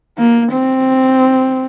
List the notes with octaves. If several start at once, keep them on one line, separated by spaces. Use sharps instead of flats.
A#3
C4